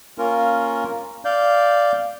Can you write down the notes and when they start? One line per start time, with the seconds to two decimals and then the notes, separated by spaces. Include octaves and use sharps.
0.18 A#3 C#4 F4 A#4
1.25 D5 F5 G6